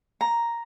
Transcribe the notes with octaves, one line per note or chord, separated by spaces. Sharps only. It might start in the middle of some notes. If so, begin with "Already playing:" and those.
A#5